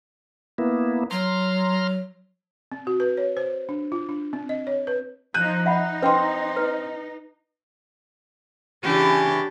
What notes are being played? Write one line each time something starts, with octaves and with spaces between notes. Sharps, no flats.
A#3 B3 E4
F#3 A#5 C6 F6
C4
F#4
B4
C#5
C5
D4
F4
D4
C4
D#5
C#5
B4
F3 D#4 F#6 G6 D#7
D#4 E5 F#5 B5
C4 B4 D#5 G5 C6
B4
C#3 E3 D4 G4